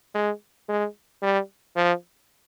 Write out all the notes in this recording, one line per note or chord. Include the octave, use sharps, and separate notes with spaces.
G#3
G#3
G3
F3